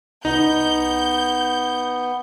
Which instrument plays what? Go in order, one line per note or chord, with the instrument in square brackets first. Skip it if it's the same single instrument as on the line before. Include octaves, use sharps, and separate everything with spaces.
[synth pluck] C2 [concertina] B3 [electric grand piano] D#4 [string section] G6